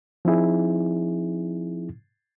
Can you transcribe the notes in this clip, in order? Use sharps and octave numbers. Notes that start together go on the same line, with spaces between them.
F3 C4 D#4 E4 G#4